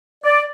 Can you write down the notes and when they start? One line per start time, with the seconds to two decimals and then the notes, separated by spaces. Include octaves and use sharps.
0.25 D5